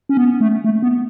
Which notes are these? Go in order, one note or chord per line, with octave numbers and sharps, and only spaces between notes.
C#4
B3
A3
A3
B3